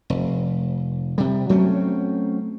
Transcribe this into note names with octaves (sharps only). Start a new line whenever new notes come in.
F1
C3 G3
F#3 A3 C4 C#4